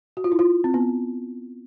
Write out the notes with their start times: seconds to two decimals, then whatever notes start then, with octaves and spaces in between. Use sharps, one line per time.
0.17 F#4
0.24 F4
0.32 E4
0.39 F4
0.64 C4
0.74 B3